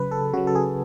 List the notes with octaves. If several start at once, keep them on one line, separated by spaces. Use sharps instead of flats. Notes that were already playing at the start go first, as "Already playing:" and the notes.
Already playing: C#3 F#3 B4
A4
C#3 F#3 F#4
A4
G#4